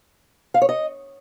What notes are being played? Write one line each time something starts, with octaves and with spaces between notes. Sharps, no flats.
F5
C#5
D#5